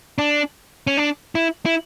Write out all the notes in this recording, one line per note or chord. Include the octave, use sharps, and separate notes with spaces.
D4
C#4
D4
E4
E4